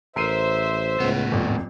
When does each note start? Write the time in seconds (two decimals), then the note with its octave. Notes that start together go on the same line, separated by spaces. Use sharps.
0.16 A1 A#4 C5 E5 C7 D#7
1.00 C#2 A2 B3
1.31 D#1 G#1 F2